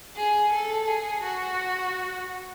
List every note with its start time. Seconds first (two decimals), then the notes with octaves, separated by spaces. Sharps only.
0.16 G#4
0.52 A4
0.87 G#4
1.23 F#4